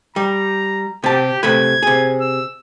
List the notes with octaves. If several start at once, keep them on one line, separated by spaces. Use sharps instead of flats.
G3 A#5
C3 G4 A5
C3 A3 B4 G#6
C3 G#4
E6